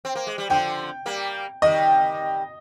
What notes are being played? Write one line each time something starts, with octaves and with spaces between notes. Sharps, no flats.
C4
A#3
G#3
G3
D3 F3 G5
G3 A#3
D#3 G3 D#5